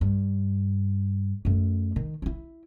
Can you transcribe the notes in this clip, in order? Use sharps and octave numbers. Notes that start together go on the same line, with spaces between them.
G2
F#2 A3
D#3
D#4 E4